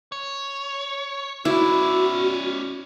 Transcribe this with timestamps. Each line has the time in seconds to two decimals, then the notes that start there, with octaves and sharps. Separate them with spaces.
0.12 C#5
1.45 C#4 E4 F#4 D5